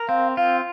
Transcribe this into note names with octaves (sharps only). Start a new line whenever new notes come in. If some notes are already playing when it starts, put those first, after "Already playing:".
Already playing: A#4
C4 F5
F4 F5